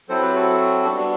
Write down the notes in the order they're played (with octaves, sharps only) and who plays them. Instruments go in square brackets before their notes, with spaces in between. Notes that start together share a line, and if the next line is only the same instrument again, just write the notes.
[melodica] F#3 C4 E4 A4 C5
G4 B4
F#4 A4
G3 B3 D4 G4
F#4